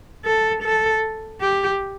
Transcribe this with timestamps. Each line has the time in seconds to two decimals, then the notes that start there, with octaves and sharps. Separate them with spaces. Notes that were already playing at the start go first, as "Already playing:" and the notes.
0.25 A4
0.63 A4
1.41 G4